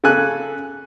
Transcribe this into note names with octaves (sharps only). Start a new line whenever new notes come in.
C#3 A4 G#5 F#6